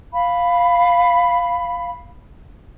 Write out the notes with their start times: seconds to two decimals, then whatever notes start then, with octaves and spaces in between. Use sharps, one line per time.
0.13 F5 B5